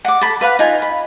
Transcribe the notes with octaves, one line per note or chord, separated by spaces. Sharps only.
F#5 D6
A4 B5
B4 F5 F#5
D#4 F4 G#5
B5